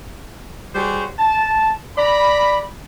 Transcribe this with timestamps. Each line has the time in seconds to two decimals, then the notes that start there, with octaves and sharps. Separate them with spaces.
0.75 G3 F#4 G#4 C5 C#5
1.19 A5
1.97 D5 A#5 B5